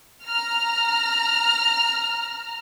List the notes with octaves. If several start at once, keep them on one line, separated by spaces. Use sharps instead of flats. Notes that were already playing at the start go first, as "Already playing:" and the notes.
A#5 F6